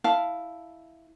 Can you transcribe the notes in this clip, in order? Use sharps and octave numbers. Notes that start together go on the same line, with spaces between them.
E4 F5 A5